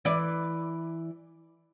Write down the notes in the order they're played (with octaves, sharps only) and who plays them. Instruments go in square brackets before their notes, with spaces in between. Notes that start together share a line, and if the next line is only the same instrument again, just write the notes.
[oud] E3 D5